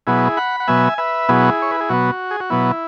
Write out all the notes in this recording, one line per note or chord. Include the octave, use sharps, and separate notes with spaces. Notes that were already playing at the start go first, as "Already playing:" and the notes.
B2 F#3 B3 E4 G#4
F#5 B5
F#5
B2 F#3 B3 E5 G#5
B4 E5
B2 F#3 B3 E4 G#4
C#5
B4
G#4
B2 F#3 B3 F#4
G#4
F#4
B2 F#3 B3 E4